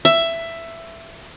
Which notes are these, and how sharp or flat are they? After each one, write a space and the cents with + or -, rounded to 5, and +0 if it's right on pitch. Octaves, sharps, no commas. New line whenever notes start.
E5 +10